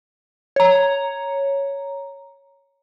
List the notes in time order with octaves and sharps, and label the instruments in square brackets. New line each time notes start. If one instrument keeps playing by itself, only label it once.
[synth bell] C#5 A#5